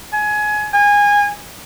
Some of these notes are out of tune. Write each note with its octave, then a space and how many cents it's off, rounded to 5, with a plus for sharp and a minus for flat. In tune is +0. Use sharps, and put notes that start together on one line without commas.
G#5 +20
G#5 -20